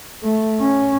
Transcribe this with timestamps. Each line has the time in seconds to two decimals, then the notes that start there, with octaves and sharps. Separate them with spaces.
0.23 A3
0.60 C#4